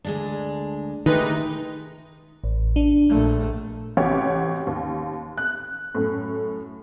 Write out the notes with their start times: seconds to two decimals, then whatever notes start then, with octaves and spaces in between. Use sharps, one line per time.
0.05 D2 G#3 D4
1.06 D#3 G#3 A3 D#4 G4 B4
2.44 A1
2.76 D4
3.10 A#1 A3
3.97 A1 C3 F#4 G4 C#5
4.67 D#2
5.38 F#6
5.95 F#2 A2